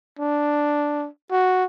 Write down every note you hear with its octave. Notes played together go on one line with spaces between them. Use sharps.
D4
F#4